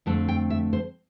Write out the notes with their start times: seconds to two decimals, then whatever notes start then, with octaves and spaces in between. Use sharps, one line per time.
0.06 F2 D3 A3 C4 A4
0.28 G5
0.50 E5
0.73 C5